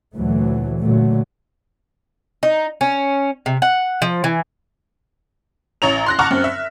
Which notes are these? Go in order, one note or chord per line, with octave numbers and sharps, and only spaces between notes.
D2 A#2 E3 F#3 A3
A#2 D3 F#3 A3
D#4
C#4
C3
F#5
F3
E3
A1 C#5 A#5 F7
C6 F#6 A#6
F#5 A5 A#5 C#6 D6 F6
F#2 C4
E5